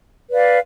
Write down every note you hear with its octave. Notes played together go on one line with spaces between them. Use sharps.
B4 D5 F5